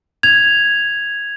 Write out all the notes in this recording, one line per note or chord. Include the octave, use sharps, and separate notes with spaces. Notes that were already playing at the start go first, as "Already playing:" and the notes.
G#6 F7